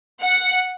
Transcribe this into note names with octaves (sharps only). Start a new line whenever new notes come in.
F#5